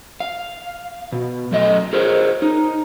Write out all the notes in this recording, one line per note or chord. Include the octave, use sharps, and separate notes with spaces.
F5
B2
F#2 A3 D#5
G#4 A#4 C5 C#5
D#4